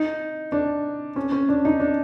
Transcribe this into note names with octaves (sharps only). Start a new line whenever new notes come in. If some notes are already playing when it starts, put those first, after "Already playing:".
Already playing: D#4
D4
C#4
C#4
D4
D#4
D4